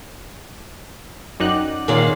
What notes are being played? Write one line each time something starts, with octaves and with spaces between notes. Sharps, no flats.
F#2 D#4 D5 F#5 G5 F#6
A#2 D#3 G#3 A#3 C#5 D5 F5